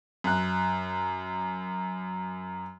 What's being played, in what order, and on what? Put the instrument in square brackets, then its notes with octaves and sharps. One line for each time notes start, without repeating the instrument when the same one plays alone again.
[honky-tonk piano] F#2 F#6